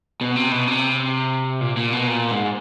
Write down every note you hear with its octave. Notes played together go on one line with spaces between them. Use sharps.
B2
C3
B2
C3
A#2
A#2
B2
A#2
G#2